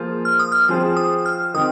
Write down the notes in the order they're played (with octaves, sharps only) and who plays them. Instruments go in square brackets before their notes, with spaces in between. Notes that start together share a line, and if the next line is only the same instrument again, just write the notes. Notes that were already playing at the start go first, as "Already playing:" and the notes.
Already playing: [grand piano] F3 A#3 F4 G#4 C5
[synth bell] F6
D#6
F6
[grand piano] F3 C4 F4 G#4 C5
[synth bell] D#6
F6
[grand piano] D#3 C4 [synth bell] D#6